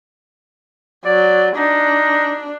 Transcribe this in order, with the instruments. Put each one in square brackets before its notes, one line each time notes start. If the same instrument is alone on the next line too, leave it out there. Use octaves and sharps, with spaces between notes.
[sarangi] F#3 [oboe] D5
[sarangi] D4 [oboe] D#4